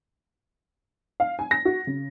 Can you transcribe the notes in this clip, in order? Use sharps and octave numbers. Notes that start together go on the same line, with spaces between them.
F5
G#5
A#6
F#4
C#3